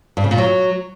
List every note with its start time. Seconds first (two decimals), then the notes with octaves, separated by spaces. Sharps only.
0.17 G2
0.24 C#3
0.31 A#2
0.38 F#3